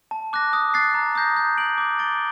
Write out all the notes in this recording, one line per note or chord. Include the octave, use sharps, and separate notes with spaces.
A5
D6 F#6 A#6
D#6
F#6 A6 C7
A#5
D#6 G6 A#6
G6
D7 F#7
D6
A6 D7 G7